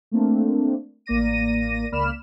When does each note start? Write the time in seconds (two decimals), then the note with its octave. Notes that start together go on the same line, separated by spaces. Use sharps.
0.11 A3 A#3 C4 D4
1.06 A1 A#3 D5 A#6 D#7
1.92 C#2 A#3 D5 B5 F6 E7